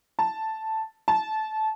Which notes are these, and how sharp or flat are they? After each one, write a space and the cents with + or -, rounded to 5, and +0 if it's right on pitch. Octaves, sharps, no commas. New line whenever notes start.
A5 +0
A5 -20